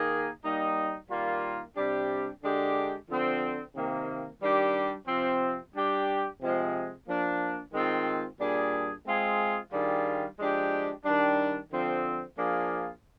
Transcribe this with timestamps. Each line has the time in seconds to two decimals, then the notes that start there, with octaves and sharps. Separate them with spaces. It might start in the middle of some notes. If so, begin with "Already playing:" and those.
Already playing: D#3 A#3 D#4 G#4
0.43 G3 A#3 D#4
1.09 D#3 G3 A#3 F4
1.76 C3 G3 D4 G4
2.42 D3 G#3 D4 G4
3.09 D3 F3 C4
3.75 C3 D#3 A#3
4.41 D#3 G3 D4 G4
5.07 C3 F3 C4
5.74 G3 D4 G4
6.40 C3 F3 G#3
7.07 F3 A#3 D4
7.73 D#3 G#3 C4 F4
8.39 A#2 G3 D4 G#4
9.06 G#3 C4 F4 G#4
9.72 D#3 G3 D4 F4 G#4
10.39 F3 G#3 D4 G4
11.05 D#3 G3 D4
11.71 D3 F3 C4
12.38 F3 A#3 D4 F4 G#4